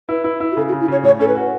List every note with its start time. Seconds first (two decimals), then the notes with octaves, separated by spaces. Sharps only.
0.09 E4 B4
0.24 E4
0.40 E4
0.51 F#4
0.57 C#3 A4
0.68 F#4
0.72 C#3
0.81 E4
0.88 C#3 C#5
1.03 A2 C#5
1.19 C#4 A4
1.28 B4
1.35 F#4